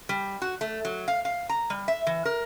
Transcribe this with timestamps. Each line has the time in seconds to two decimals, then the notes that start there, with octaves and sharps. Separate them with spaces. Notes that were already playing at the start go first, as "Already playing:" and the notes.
0.09 G3
0.42 F#4
0.61 A3
0.85 F#3
1.08 F5
1.25 F5
1.49 A#5
1.70 G3
1.88 E5
2.07 E3
2.25 A#4